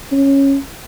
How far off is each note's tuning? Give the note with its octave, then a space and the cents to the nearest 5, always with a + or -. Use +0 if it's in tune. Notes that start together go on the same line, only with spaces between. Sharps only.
C#4 -10